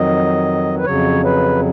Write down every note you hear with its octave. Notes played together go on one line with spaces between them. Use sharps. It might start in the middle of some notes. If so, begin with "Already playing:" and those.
Already playing: F2 D#3 F#3 D#5
B4
F2 C#3 F#3 C#5
B4